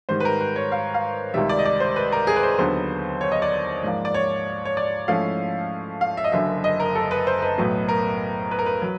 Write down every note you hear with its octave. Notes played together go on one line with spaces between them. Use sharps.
G#2 D#3 G3 C5
B4
A#4
B4
C#5
F5
F5
C#2 C3 D#3 G3 E5
D5
D#5
D5
C5
B4
A#4
G#4
B4
C5
D#2 D3 F#3 B3 C5
C#5
D#5
D5
G#2 F3 A#3
D5
C#5
C#5
D5
G#2 F3 A3 C#4 E4 F5
F5
E5
D#5
F#1 F#2 D3 E5
D#5
A#4
A4
B4
C5
B4
B1 A2 F#3 B3
A#4
B4
A#4
B4
F#3